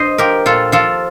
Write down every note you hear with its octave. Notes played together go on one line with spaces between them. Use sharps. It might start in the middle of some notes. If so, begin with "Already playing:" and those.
Already playing: G2 C5 D#5
F3 G4 A#4
A#2 F4 A4
F3 F4 A4